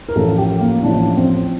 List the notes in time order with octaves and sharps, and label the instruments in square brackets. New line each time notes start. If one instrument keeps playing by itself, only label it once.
[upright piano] A#4
A1 A2 F3 A4
G4
A#3
A1 A2 F3 D4
C4